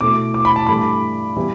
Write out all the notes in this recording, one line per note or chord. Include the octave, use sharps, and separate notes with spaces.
B2 A3 E4 D6
D6
B5
A5
G2 E3 A3 B5
E3 G3 B3 E4